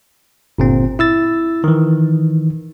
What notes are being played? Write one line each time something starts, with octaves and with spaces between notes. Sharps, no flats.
G1 A#2 C4
E4 E6 A6
D#3 E3